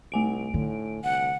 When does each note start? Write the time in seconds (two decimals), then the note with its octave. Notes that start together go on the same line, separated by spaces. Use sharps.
0.12 C2 A3 G#5 D7
0.54 A2 D3
1.04 C2 F#5